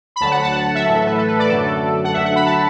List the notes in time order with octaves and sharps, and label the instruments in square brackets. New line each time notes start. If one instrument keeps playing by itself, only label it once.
[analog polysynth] B5
D2 D3 F#3 A5
F#5
A5
F#5
F#5
E5
A2 E3 A3
A4
B4
A4
B4
D5
F#2 D3 F#3 A3 A4
F#5
D2 D3 F#3 E5
F#5
B5
A5